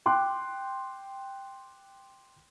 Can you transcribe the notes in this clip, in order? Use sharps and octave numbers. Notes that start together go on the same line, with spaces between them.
G5 C6 D6 F#6